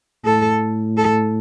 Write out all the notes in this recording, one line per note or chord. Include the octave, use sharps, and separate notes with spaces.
A2 A4
A4